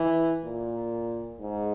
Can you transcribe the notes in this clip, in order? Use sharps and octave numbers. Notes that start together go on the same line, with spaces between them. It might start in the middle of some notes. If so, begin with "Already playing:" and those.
Already playing: E3
A#2
G#2